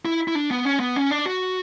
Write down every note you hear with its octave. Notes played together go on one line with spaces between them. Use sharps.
E4
E4
D4
B3
C#4
B3
C#4
D4
F#4